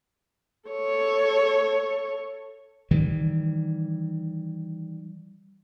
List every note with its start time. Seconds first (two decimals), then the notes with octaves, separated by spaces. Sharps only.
0.69 A4 C#5
2.91 D#3 E3 G3